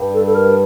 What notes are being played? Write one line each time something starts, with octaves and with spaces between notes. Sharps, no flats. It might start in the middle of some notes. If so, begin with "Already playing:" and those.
Already playing: G2
A4
A4
A#4